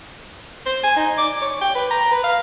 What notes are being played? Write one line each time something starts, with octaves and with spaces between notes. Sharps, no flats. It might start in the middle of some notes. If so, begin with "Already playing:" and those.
C5
G#5
D#4
D6
C#5
G5
B4
A#5
B4
F5